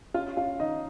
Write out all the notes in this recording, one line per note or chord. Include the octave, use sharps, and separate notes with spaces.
C#4 F4 F5
C#4 F4 F5
D#3 D#4 D#5